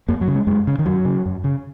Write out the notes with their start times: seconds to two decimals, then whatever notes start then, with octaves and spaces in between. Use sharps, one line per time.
0.09 F#2 A#3
0.21 F#3
0.28 C#3
0.35 G#3
0.47 F#2 G#3
0.67 C#3
0.79 D#3
0.86 F#2 F#3
1.05 C#3
1.26 F#2
1.44 C#3